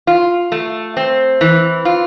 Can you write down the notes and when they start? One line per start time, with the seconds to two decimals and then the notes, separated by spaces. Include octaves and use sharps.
0.07 F4
0.52 A3
0.97 C4
1.41 E3
1.85 F4